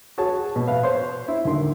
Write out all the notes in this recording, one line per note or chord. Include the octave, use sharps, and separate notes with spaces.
F#4 G#4 C#5 A5
B2
B4 E5 F5
C5 C#5 C6
E4
D2 D3 D#3 C6